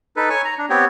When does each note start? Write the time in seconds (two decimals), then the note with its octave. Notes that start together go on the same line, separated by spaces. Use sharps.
0.17 D#4 A4 B4
0.30 C#5 G#5 C#6
0.45 A#5
0.58 D4
0.70 B3 C4 G4 C#5